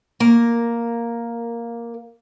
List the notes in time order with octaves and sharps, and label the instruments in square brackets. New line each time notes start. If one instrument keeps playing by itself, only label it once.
[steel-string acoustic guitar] A#3 A#4